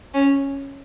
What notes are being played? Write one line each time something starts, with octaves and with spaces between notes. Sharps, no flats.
C#4